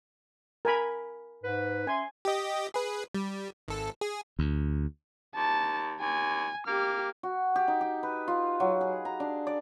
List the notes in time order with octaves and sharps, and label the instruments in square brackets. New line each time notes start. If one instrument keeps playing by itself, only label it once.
[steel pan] A#4 G#5 B5
[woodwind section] G#2 B4
[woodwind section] C#4 E5 C6 [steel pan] G#5
[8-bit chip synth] G4 D#5
G#4 B4
G3
G#1 A4
G#4
[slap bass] D2
[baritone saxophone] D#2 [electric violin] A5
[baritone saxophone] D#2 [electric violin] G#5
[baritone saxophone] A#3 [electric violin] G4 F6
[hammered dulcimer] F#4
G4
D#4
G4
B4
F4
F#3
G#4
A#5
D4
D5